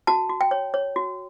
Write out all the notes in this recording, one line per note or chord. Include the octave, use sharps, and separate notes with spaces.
F#4 A5
F#4
G5
C#5
C#5
F#4